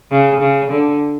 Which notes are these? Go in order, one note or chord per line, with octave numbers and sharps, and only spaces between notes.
C#3
C#3
D3